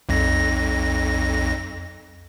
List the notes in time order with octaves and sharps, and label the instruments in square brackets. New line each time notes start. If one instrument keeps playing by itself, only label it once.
[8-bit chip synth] B1 F2 A#6